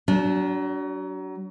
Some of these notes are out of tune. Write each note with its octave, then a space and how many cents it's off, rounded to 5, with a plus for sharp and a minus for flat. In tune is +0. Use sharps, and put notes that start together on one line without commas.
F#3 +30 D4 -25